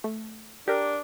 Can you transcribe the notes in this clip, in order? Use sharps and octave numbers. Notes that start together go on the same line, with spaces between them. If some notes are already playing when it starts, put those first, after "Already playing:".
A3
D4 G4 A#4